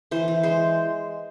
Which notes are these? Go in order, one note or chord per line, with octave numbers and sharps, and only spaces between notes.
E3 C5
E3
G#3 C5